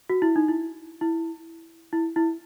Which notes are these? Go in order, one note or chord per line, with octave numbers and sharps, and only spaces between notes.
F#4
E4
D#4
E4
E4
E4
E4